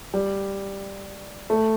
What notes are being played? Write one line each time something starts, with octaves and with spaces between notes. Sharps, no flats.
G3
A3